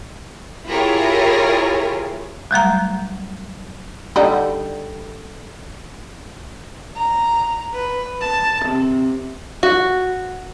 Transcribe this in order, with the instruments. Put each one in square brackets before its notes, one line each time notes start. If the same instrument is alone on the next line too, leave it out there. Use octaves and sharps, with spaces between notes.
[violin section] E4 F4 G4 G#4 A#4 C#5
[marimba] F#3 G3 A3 A#5
[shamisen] D3 G3 D#4
[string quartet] A#5
B4
A5
C3
[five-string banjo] F#4